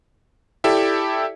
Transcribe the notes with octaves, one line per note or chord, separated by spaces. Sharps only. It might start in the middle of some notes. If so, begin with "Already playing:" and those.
E4 G4 A4 D5 E5